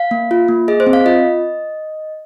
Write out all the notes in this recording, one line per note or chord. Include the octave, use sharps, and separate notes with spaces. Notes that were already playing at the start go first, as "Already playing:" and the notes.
Already playing: F5
A#3
F4
A#3
G#4 D#5
C5
C4
F5
F4 D#5